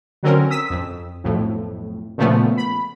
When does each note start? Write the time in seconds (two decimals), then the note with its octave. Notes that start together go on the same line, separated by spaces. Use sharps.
0.23 D3 F#3 C4 C#4 A#4
0.50 D#6 E6 B6
0.70 F2
1.24 B1 F2 A2
2.18 A#2 C#3 F3 A3 B3
2.58 B5